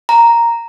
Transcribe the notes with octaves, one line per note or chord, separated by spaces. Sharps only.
A#5